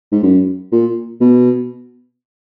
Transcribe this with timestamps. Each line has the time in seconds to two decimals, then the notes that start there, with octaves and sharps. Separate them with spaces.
0.12 G#2
0.23 F#2
0.72 A#2
1.21 B2